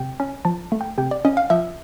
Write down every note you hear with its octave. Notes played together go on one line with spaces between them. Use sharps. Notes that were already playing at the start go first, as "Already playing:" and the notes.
Already playing: C3 G5
C#4
F3 A5
A3
G5
C3 G5
D5
C#4 D#5
F5
F3 E5